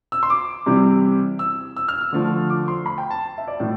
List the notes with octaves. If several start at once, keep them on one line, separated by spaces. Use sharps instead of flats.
E6
C6
D6
C3 E3 G3
E6
E6
F6
E6
D3 F3 A3
D6
C6
B5
G5
A5
E5
D5
A2 E3 A3